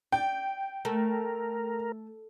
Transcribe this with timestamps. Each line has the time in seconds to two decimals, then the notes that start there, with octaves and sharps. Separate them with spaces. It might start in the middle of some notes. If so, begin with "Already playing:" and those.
0.12 D5 G5
0.85 A3 A#4